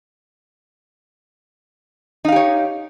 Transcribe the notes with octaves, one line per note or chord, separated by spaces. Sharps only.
D#4 G4 C#5 F5